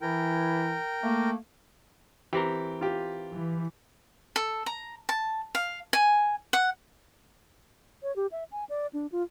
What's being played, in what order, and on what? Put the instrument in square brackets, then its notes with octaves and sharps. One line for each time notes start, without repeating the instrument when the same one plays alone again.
[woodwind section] E3 E4 [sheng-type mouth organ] A#4 G5
[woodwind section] A3 A#3
[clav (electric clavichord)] E3 C4 A#4 [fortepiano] G4
[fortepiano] F4 G4
[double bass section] E3
[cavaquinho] A4
A#5
A5
F5
G#5
F#5
[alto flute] C#5
G4
E5
G#5
D5
D4
F4